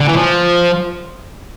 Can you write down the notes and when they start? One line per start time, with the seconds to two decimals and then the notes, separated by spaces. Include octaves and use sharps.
0.01 D3
0.09 E3
0.17 F3